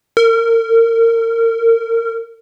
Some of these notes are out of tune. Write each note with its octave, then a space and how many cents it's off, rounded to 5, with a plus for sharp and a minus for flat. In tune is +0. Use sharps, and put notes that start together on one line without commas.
A#4 -30